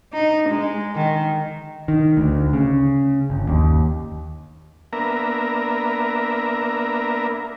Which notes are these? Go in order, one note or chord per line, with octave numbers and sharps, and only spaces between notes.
D#4
G#3
D#3
D#3
D2
C#3
G1
D#2
A#3 B3 D4 A#4 E5 A#5